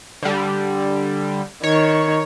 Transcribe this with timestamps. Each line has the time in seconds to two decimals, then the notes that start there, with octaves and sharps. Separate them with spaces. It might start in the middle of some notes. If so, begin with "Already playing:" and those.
0.23 D3 G3
1.63 D#3 C#5